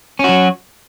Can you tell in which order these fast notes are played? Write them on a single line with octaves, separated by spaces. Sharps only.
C#4 F#4 F#3